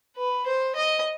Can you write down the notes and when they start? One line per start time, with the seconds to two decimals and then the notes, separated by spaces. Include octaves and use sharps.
0.17 B4
0.46 C5
0.75 D#5